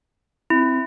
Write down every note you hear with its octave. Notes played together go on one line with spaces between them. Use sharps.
C4 E4